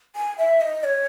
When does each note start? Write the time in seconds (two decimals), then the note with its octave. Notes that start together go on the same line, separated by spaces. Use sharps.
0.15 G#5
0.38 E5
0.61 D#5
0.84 C#5